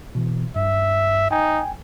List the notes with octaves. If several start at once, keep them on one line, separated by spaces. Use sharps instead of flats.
B2 E3
G2 E5
D#4 G5 G#5